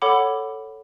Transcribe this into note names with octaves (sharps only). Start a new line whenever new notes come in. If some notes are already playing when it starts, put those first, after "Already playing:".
A4 C#5 F#5 B5 D6